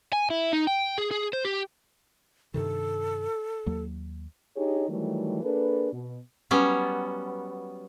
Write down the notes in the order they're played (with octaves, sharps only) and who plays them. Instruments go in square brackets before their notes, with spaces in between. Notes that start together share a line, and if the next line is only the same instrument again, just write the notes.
[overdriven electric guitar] G#5
E4
D#4
G5
G#4
G#4
C5
G4
[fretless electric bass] G2 C3 D#3 [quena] A4
[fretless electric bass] D#2 F#3 A#3
[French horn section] D4 D#4 G4 G#4 C#5
D#3 E3 F#3 G3 A3
A#3 D4 G#4 A4 B4
B2
[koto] F#3 G3 B3 C#4